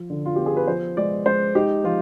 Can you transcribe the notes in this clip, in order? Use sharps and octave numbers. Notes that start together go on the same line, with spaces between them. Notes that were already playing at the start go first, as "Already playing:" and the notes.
Already playing: F3
D3
F4
B3 G4
G#4
B4
F3 C5
G#3 D5
G#3 C5
D#4 G4
F3 F4